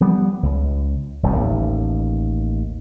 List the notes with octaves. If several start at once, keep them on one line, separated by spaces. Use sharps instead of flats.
F3 G3 B3
C#2
D#1 C2 F2 D#3
A1 D#2